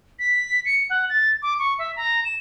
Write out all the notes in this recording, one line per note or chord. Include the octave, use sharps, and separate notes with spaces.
B6
C#7
F#5
A6
D6
C#6
E5
A#5
E7